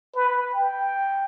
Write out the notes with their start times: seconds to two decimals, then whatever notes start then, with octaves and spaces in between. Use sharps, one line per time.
0.15 B4
0.55 G5